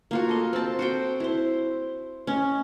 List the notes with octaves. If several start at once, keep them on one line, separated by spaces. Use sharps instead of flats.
A#3 F4 F#4
A4 D#5
C4 A5
F#4 C5 G5
E4 C5
C#4 D#5